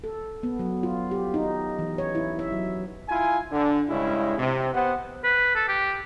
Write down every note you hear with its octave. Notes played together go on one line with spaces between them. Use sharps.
A4
B3
F#3
F4
G4
D#4
E3
C#5
E4
E5
F#3
E4 F4 G#5
D3
G2 C#3 G#3 C#4 E4
C3
B3 G4 C5 F#5
B4
A4
G4